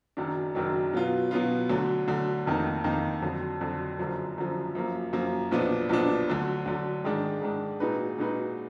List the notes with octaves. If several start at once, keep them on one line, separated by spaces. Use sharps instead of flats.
F#1 F#2 D#3 F#3 D4
F#1 F#2 D#3 F#3 D4
B2 F#3 B3 F4
B2 F#3 B3 F4
D2 D3 F#3
D2 D3 F#3
F1 F2 D#3 A#3 D#4
F1 F2 D#3 A#3 D#4
F2 D3 F#3
F2 D3 F#3
F#1 F#2 D3 F3
F#1 F#2 D3 F3
F#2 F3 A#3
F#2 F3 A#3
B1 A#2 F3 B3 D4
B1 A#2 F3 B3 D4
D2 D3 F#3
D2 D3 F#3
G#2 D#3 G#3 D4
G#2 D#3 G#3 D4
A#2 G#3 D#4 F#4 B4
A#2 G#3 D#4 F#4 B4